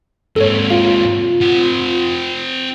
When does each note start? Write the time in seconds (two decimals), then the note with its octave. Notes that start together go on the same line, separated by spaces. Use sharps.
0.36 G#2 C3 A4 C#5
0.70 F4 F5
1.41 C4 F#5